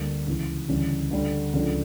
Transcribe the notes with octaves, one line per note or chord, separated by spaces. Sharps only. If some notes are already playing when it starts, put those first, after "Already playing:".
Already playing: D2 D3 G3 A#3
C#2 C#3 E3
D2 C#3 E3 G3 C#4
D2 D3 G3 D4
C#2 C#3 F3 A3 D4